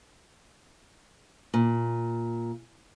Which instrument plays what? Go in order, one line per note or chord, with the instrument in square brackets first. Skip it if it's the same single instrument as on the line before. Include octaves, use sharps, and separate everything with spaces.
[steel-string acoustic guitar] A#2